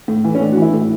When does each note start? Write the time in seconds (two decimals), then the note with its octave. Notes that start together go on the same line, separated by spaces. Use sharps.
0.08 A2
0.24 E3
0.35 C#4
0.41 A2 D4
0.52 F#4
0.57 E3
0.62 E4
0.73 A2